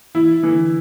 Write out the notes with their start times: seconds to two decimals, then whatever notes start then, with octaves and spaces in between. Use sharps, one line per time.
0.15 E3 E4
0.43 D3 E3